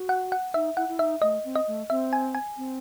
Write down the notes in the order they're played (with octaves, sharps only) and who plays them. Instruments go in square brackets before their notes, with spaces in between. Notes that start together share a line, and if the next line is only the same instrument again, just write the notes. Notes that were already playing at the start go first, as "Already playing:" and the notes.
Already playing: [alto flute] F#4
[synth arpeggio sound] F#5
F#5
[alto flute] D#4 [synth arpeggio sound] E5
[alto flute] E4 [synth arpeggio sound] F#5
[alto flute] E4
[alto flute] D#4 [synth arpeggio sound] E5
[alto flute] A3 [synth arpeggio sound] D#5
[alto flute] C4
[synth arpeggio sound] D#5
[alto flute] A3
[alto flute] C4 [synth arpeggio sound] E5
[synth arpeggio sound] G#5
G#5
[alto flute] C4